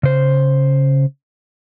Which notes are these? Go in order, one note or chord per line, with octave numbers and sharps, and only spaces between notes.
C#3 C5